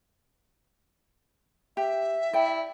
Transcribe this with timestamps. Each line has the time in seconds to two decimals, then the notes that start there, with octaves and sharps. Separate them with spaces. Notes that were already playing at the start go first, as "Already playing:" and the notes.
1.77 G4 E5
2.33 E4 D5 G5